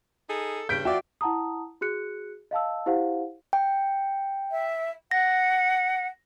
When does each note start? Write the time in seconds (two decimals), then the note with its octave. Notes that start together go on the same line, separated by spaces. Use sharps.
0.28 D#4 G#4 A4
0.69 G2 C#3 G6 B6 D7
0.85 F3 F4 F#4 D5 E5 G5
1.21 E4 F#5 A5 A#5 D#6
1.81 F#4 G#4 F#6 C#7
2.51 D#5 F5 A5 E6
2.86 E4 G4 C5 F5 F#5
3.53 G5
4.51 E5
5.11 F#5 A#6